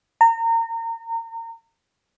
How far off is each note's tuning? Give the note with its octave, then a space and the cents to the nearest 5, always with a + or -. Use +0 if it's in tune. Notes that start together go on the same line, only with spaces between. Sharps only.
A#5 -30